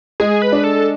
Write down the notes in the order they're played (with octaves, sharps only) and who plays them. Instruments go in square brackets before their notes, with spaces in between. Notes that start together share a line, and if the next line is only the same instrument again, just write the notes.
[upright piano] G#3 [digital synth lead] G#4
[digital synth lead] B4
[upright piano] D4
[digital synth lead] A4